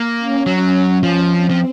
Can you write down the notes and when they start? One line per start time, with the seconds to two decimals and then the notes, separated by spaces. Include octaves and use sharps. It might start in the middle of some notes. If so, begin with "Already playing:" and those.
Already playing: A#3
0.18 C#4
0.46 F#3
1.03 F3
1.32 C4
1.50 F3